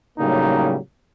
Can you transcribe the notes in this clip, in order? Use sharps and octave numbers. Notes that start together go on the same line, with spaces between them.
A2 C#3 F#3 G3 A#3 D#4